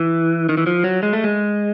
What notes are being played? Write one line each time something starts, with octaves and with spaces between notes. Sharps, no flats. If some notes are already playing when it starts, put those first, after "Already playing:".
Already playing: E3
D#3
E3
F3
F#3
G#3
A3
G#3